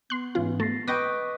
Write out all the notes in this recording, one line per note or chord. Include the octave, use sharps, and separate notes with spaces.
B3 C6 F#6
G#2 E3 C#4 F4
A3 A6 A#6 C7
B4 D#5 G5 C#6 D6 A#6